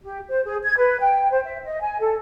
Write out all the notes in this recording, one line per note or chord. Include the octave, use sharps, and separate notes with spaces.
G4
C5
G#4
G#6
B4
G5
C5
E5
D#5
G#5
A4